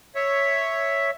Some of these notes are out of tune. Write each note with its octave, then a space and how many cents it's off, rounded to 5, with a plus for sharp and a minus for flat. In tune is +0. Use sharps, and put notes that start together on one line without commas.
C#5 +0 E5 +0